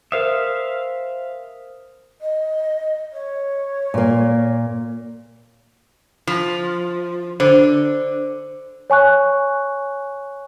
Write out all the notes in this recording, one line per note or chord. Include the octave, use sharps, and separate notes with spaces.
A#4 C5 E5 F5 D#6
D#5
C#5
A#2 A#3
F3
D3 C5
C#5 G#5 C#6 F#6